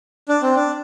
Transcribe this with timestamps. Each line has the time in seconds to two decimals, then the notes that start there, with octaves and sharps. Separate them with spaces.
0.29 D4
0.42 C4
0.55 D4